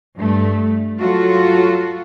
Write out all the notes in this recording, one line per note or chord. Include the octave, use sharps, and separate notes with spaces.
G2 A3
F#3 F4 F#4 A4